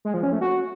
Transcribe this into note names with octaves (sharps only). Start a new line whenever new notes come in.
G#3
F3
C#4
A3
F#4